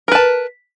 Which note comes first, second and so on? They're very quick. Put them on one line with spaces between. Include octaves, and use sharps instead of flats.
A#4 B4 A5